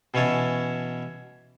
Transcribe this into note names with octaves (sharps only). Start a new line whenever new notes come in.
B2 E3 C#4 C#5 E5 A5